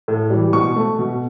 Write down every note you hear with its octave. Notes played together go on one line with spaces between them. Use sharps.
A2
E3 G3
B2 C#6
A3
B2